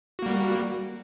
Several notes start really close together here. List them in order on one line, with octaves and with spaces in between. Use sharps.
F#4 A#3 G3